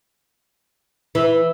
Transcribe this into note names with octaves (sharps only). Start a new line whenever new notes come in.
E3